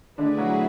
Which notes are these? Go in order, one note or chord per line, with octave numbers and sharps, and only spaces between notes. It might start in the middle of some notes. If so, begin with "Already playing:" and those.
D3 A3 C4 D4 E4 G#4 B4
F#3 F#4